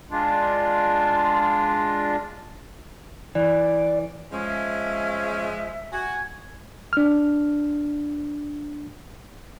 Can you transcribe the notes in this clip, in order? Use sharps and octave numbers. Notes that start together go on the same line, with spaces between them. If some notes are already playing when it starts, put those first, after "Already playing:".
G#3 D4 F4
E3 D5
F3 G#3 C#4
E5
F#4 G#5
D4 F6